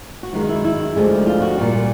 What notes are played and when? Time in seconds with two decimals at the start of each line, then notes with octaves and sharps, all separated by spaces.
0.23 F#4
0.33 F#2 D#3 G#3 F4
0.44 D#4
0.49 E4
0.64 E4
0.96 D2 D3 F3 G#3
1.27 F4
1.42 F#4
1.58 A#2 G3